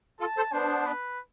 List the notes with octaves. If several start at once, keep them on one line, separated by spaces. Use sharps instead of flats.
F4 A4 A5
A4 C5
B3 D4 C5
B4